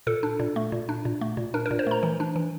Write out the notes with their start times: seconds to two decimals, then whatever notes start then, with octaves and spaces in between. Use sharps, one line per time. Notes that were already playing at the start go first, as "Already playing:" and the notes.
0.07 A#2 A4
0.23 D4
0.40 A#2
0.56 A3
0.72 A#2
0.89 D4
1.05 A#2
1.21 A3
1.37 A#2
1.54 D4 A#4
1.66 A#4
1.71 A#2
1.79 C5
1.87 A3 A#5
2.03 E3
2.20 D4
2.36 E3